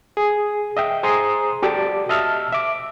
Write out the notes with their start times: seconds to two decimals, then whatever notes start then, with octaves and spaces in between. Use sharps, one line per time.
0.17 G#4
0.77 D#5 E5 G5
1.03 G#4 C5 A#5 C6 D#6
1.62 F#4 G4 A4 D5 A5 D6
2.09 D#5 E5 A5 E6 F6
2.52 E5 D6